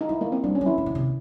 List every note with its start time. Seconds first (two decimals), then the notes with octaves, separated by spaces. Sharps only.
0.01 D#4
0.09 A3 E4
0.21 A#3
0.32 C4
0.44 G3 D4
0.55 C#4
0.61 F#3
0.66 E4
0.78 E3
0.86 D3
0.95 C3